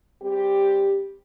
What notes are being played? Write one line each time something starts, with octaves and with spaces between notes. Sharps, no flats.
G3 C4 G4